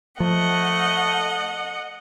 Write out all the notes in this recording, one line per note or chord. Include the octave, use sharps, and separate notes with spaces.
F3 A3 D#5 F#5